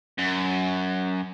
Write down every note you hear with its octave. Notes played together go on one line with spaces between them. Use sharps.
F#2